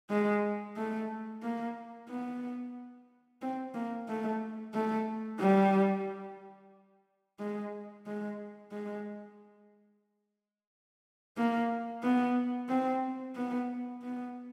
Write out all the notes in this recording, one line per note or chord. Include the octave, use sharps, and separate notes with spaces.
G#3
A3
A#3
B3
C4
A#3
A3
A3
G3
G#3
G#3
G#3
A#3
B3
C4
B3
B3